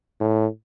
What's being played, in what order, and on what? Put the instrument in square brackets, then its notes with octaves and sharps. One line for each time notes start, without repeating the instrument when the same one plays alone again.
[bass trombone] A2